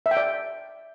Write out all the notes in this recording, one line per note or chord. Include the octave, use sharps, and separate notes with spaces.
E5
G5
D5